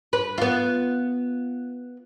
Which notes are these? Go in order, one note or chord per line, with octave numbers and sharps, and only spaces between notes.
B4
B3 F4